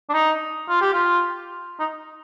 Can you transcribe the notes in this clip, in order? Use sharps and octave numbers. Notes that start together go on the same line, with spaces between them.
D4
D#4
F4
G4
F4
D#4